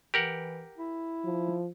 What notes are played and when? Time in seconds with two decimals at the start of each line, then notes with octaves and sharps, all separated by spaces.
0.14 E3 G4 A#4 F#5
0.77 E4
1.24 F3